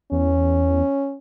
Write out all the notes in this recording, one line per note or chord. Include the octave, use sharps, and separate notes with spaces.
E2 C#4